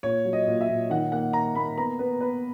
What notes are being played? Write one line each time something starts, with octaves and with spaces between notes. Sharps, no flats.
A#2 C#5
F#3
D#5
A#2
E5
A#2
D#3 F#5
A#3 F#5
A#3 A#5
A#3 B5
B3 A#5
B3 B4
B3 B4